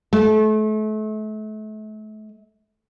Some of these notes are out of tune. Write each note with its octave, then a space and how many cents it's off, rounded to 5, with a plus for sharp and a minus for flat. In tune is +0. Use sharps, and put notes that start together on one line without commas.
A3 -35